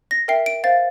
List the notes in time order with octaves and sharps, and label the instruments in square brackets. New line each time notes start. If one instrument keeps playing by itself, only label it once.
[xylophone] A#6
A#4 E5 G5 C7
D7
C5 F5 A6